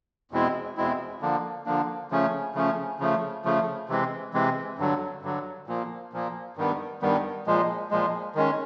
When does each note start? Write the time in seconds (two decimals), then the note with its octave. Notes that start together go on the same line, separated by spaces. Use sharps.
0.31 E2 B2 G#3 C4 E4
0.77 E2 B2 G#3 C4 E4
1.21 D3 F3 A#3 D4
1.66 D3 F3 A#3 D4
2.11 C#3 F3 A3 C#4
2.54 C#3 F3 A3 C#4
2.99 C#3 F3 A3
3.45 C#3 F3 A3
3.88 C3 E3 G#3 C4
4.33 C3 E3 G#3 C4
4.78 G2 D3 F#3
5.22 G2 D3 F#3
5.67 A#2 F3 A#3
6.12 A#2 F3 A#3
6.56 G2 D#3 G3 B3
7.02 G2 D#3 G3 B3
7.47 A#2 F3 G#3
7.91 A#2 F3 G#3
8.35 D#3 G#3 C#4